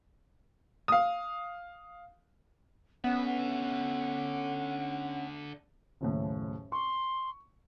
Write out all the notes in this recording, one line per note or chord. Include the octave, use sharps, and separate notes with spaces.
F5 D#6
D3 B3 C#4 E5 F#5
F#1 D#2 A2
C6 C#6